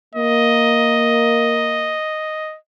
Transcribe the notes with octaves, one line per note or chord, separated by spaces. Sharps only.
A#3 D#5